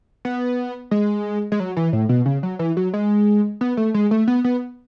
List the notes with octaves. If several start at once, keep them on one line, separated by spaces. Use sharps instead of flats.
B3
G#3
G#3
F#3
E3
A2
B2
C#3
F#3
E3
F#3
G#3
B3
A3
G#3
A3
B3
B3